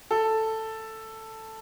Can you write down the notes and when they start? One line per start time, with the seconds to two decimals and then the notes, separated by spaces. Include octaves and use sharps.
0.11 A4